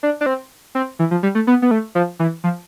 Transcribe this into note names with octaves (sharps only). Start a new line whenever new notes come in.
D4
D4
C4
C4
E3
F3
G3
A3
B3
B3
A3
F3
E3
F3